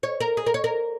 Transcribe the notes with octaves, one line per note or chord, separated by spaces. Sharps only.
C#5
A#4
G#4
A#4
C#5
A#4